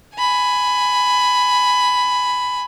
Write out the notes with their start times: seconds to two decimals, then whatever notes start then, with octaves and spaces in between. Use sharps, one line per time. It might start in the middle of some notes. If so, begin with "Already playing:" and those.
0.16 G#5 B5